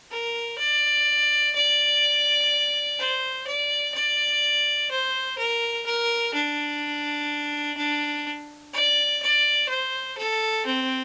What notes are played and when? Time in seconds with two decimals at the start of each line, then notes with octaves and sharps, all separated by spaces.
0.11 A#4
0.59 D5
1.55 D5
2.99 C5
3.47 D5
3.94 D5
4.91 C5
5.38 A#4
5.86 A#4
6.34 D4
7.77 D4
8.74 D5
9.22 D5
9.69 C5
10.18 A4
10.66 C4